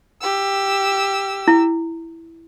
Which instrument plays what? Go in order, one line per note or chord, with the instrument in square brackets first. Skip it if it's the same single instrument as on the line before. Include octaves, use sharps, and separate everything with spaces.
[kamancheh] G4 E6
[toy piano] E4